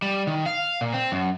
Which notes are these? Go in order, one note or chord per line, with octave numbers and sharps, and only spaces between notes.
G3
D#3
F5
A#2
C4
F#2